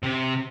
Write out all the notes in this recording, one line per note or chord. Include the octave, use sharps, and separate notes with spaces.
C3